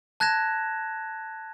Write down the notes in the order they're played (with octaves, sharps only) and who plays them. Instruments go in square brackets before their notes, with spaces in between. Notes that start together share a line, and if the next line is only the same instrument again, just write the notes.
[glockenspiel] A5 F#6 G#6 A#6 E7